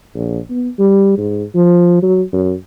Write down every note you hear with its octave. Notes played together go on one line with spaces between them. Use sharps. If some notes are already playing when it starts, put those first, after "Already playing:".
A#1
B3
G3
G#2
F3
F#3
F#2